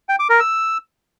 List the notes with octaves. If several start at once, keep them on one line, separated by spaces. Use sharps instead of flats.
G5
D6
A#4
E6